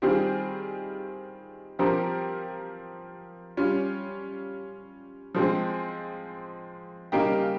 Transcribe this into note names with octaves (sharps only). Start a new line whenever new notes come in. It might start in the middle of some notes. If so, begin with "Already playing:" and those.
D#3 G3 C4 F4 G#4
F3 C4 G4 A#4
G3 C#4 F4
F3 G#3 C4
C#3 G3 A#3 D#4 G4